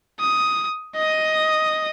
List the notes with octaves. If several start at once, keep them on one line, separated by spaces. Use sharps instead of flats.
D#6
D#5 D#6